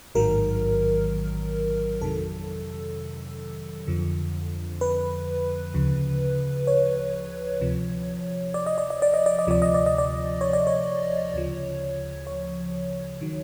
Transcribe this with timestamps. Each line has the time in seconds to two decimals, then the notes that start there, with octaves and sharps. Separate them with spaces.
0.15 A1 G#2 D#3 F#3 A#4
2.01 F2 C3 D#3 F#3 A4
3.87 F2 D3 F3
4.81 B4
5.74 D2 C#3 F3
6.67 C#5
7.60 D2 C3 F3
8.54 D5
8.66 D#5
8.78 D5
8.90 D#5
9.02 D5
9.14 D#5
9.26 D5
9.39 D#5
9.47 D2 C3 F3 D5
9.62 D#5
9.74 D5
9.86 D#5
9.98 D5
10.41 C#5
10.53 D5
10.67 C#5
11.34 D2 C#3 F3
12.27 C#5
13.21 D#3 F#3